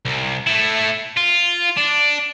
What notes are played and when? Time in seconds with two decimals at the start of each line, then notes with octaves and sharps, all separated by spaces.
0.05 C2
0.47 A3 E4
1.17 F4
1.77 D4